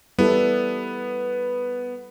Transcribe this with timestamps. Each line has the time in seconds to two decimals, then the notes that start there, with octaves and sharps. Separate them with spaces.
0.19 G3 B3 E4 A4